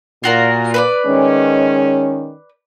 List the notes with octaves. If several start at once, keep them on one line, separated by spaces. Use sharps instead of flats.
A#2 F4 F#4 A#4
B4 C5 D5
D#3 G#3 C#4